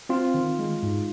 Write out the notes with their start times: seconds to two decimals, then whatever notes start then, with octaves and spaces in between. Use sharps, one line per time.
0.09 C4 F4
0.34 D#3
0.59 G#3
0.83 G#2